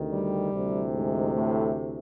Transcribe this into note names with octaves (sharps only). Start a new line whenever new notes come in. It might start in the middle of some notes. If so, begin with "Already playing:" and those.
Already playing: D2 C3 D#3
G3
D2 C3 E3
G#2 G#3
A2 A3